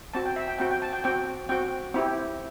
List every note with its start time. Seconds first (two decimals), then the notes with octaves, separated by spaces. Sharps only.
0.14 C4 F#4 A5
0.26 G5
0.36 E5
0.48 G5
0.59 C4 F#4 G5
0.71 G5
0.82 A5
0.93 G5
1.04 C4 F#4 G5
1.49 C4 F#4 G5
1.94 C4 E4 G4